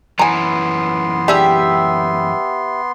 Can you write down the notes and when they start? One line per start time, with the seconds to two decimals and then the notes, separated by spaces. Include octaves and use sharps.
0.19 F#2 E3 B3 G#5 A#5 C6
1.28 D4 G4 G#4 E5